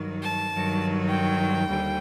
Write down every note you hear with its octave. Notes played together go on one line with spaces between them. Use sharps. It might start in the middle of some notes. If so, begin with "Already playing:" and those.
Already playing: G2 D#3 F#3
A5
G2 D#3 F#3
G5
D#2 D3 G3